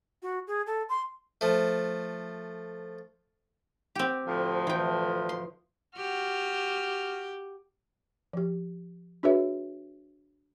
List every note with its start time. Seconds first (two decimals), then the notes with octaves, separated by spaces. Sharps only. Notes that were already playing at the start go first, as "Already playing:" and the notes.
0.23 F#4
0.47 G#4
0.67 A4
0.89 C6
1.41 F3 A3
3.95 C4 G4
4.26 D2 A2 F3
4.67 E3 G5
5.29 C6
5.97 F#4 G4 F6
8.33 F3 G4
9.23 D4 F#4 G#4 B4 C#5 E5